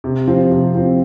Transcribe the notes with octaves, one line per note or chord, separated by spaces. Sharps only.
C3
F3 C4
C3
F3 C4